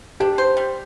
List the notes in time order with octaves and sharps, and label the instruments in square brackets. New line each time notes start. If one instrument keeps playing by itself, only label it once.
[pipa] D4 [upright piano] G4
[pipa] C5
G3